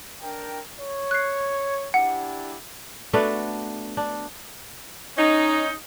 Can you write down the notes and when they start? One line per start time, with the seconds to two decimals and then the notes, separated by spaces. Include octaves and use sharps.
0.21 D4 A#4 G5
0.77 C#5
1.11 F#6 C7
1.94 D4 E4 G4 F#5
3.13 A3 B3 D4 F#4
3.97 D4
5.18 C#4 D#4